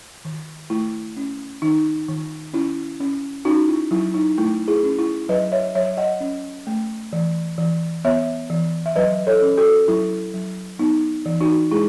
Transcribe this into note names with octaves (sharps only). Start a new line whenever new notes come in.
D#3
A3 E4
C#4
D#3 D#4
D#3
C#4 E4
C#4
C#4 D#4 F#4
E4
F#3 E4
D#4
A3 E4
E4 G#4
C#4
E4
F#3 B4 D#5
C#5 E5
F#3 C#5 E5
D#5 F#5
C#4
A3
E3
E3
B3 C#5 E5
E3
E5
F#3 B4 D#5
A4 C#5
C#4
F#4 A4
F#3 E4
F#3
B3 D#4
E3
D#4 F#4
G#3 E4 G#4